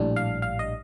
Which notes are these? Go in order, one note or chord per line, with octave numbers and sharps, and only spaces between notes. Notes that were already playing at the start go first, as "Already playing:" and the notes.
Already playing: A#1 A2 G3 D4
F5
F5
D#5